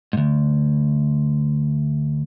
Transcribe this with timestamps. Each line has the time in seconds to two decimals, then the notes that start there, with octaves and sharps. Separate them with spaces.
0.13 D2 G#2